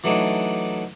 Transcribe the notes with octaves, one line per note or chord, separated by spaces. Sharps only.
E3 F#3 A3 D4 D#4